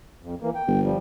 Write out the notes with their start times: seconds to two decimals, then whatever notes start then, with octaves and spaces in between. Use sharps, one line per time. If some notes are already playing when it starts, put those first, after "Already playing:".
0.23 F2
0.42 E3 A#3
0.55 G5
0.67 G1
0.83 F3 G3